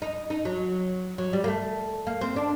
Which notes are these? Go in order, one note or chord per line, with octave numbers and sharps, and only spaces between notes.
D#4
D#4
F#3
F#3
G3
A#3
A3
A#3
C4
D4